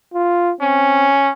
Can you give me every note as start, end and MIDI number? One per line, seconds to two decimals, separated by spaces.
0.14 0.52 65
0.60 1.08 60
0.60 1.30 61